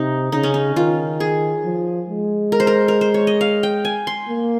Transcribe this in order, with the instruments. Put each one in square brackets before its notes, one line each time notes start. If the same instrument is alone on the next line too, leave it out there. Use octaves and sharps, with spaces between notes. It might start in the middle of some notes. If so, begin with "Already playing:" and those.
Already playing: [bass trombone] C3 [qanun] D#4
[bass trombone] C#3 [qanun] D#4
[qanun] C#4
D#4
[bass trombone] D#3 [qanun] F4
[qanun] G#4
[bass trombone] F3
G#3
[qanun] A#4
C5
A#4
A#4
C5
C#5
D#5
F5
G5
G#5
C6
[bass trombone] A#3